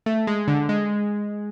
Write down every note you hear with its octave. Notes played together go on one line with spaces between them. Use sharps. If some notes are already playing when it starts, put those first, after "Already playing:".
A3
G#3
D3
G#3